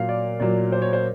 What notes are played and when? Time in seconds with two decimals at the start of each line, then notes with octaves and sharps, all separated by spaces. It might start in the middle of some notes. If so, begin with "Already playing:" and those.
Already playing: A#2 F#3 F5
0.09 D5
0.40 A#2 F#3 D5
0.72 C5
0.82 C#5
0.93 C5